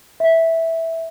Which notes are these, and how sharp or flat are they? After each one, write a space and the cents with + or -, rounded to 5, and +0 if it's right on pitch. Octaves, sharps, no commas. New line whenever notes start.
E5 -10